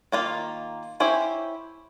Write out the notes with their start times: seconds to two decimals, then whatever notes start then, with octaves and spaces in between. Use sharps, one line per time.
0.12 D#3 A#3 F4
1.00 C#4 E4 G4 C5 C#5